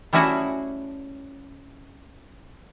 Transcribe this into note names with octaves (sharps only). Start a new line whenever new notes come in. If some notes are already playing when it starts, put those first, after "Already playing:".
G3 A3 C#4 E4 F#4 G#4